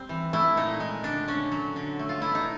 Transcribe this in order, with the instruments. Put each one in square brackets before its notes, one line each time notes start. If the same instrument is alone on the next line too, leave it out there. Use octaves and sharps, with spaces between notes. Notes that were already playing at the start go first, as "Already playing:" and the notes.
Already playing: [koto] G3 C4
E3
A3 E4
A#2 D#4
G#3
D3 D4
D3 C#4
F#3
D3
A3
F4
B2 E4
D#4